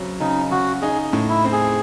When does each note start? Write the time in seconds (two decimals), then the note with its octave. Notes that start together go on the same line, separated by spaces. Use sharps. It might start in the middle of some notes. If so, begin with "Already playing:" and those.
Already playing: C#3 F#3 C4
0.20 C#3 D#4
0.51 C#3 F#4
0.82 D#4 G#4
1.13 A2
1.29 E4
1.44 C4
1.52 G#4